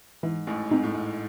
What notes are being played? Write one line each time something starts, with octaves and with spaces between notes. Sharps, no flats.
G#2 E3
A1 A2
G#2 C4 D#4
A2
G#2